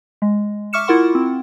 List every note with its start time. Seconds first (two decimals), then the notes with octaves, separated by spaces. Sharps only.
0.22 G#3
0.73 E5 C#6 D6 F6 C#7 E7
0.87 E4 F4 A#4 F#5 C6 C#6
1.15 C4